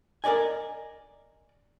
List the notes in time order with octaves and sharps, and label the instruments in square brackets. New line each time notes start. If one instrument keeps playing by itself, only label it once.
[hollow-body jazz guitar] A#4 B4 D5 D#5 G#5